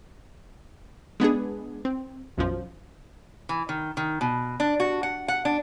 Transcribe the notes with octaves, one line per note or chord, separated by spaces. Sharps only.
G#3 B3 D4 G#4
C4
B1 F#2 F3
E3
D#3
D#3
B2
D4
F#4
F#5
F#5
D4